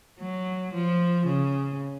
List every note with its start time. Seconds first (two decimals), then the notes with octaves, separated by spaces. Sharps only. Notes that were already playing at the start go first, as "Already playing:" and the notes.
0.21 F#3
0.74 F3
1.27 C#3